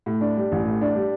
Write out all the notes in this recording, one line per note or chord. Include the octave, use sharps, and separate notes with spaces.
A2
D4
G3
A1
A2
D4
G3